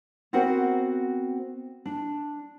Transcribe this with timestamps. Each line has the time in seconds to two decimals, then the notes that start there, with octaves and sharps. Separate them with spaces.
0.33 B3 C4 F#4 A#4 C5 F#5
1.85 D4